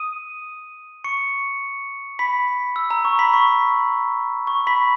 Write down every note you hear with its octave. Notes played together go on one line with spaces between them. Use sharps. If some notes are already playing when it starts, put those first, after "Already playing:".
Already playing: D#6 D#7
C#6 C#7
B5 B6
E6
A#5
C#6
B5 B6
C#6
C#6
B5 B6